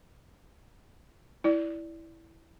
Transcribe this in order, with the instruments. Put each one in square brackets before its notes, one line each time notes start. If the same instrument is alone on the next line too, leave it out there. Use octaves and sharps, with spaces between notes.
[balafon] E4 D5